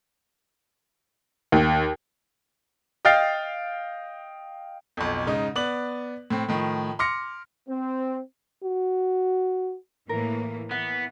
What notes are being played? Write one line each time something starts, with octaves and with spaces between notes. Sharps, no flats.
D#2
D#5 F5 G5 F6 A6 C7
B1 F2
G#2 C#3 D#4
B3 D5 F#7
A2 C4
A2 D#3 F3
C6 D6 F6 A#6 C#7
C4
F#4
A2 E3 A#3 A#4
E3 B3 F#5